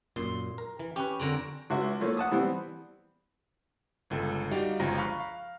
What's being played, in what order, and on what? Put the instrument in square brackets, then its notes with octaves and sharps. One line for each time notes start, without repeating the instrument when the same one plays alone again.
[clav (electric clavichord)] F#2 A#2 [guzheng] C6
[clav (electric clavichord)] A#4
E3
[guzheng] C#4 [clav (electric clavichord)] G4 B4
[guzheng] F2 D3 A#4
[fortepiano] C#2 F#4 E5
F3 A3 A#3 C#4
F#5 A5 D#6
E3 G3 B3 C4
[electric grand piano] G1 C#2 A4
G3 D#4 F#4 G4 D5 F5
G1 C#2 F3 A#5 A#6
F5 A#5 B5 C#6 F6 F#6
F5